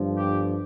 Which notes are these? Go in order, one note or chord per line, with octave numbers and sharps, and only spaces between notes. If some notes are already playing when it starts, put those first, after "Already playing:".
Already playing: G1 G2 F3
G4